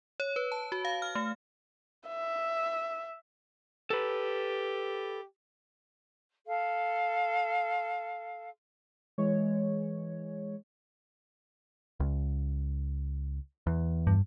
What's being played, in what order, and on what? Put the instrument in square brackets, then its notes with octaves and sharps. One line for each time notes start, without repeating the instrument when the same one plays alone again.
[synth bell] C#5
B4
A5
F#4
F5
F6
A3
[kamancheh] E5
[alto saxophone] G4 [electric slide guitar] A4 B4
[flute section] A4 F5
[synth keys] E3 G#3 C#5
[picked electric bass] C#2
E2
[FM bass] G2